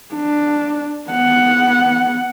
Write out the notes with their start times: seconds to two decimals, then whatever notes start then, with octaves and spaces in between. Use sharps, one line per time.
0.14 D4
1.10 B3 F#5